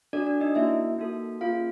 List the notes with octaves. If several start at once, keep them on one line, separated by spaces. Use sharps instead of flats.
D4 F#4 A4 D5
D4 D5
D#4 D#5
A#3 C#4 E4 F#4 E5
A#3 D#4 F#4 A4
A#3 C#4 F4 G#4 F5